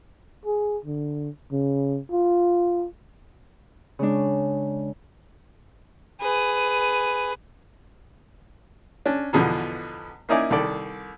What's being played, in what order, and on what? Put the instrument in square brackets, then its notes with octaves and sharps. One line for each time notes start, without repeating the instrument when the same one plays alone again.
[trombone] G#4
D3
C#3
F4
[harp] C#3 G#3 D4
[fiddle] G#4 B4
[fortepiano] C#4 D4
E2 B2 D3 F3
A#3 C#4 D#4 E4 D5 G#5
C2 D#3 A4 D5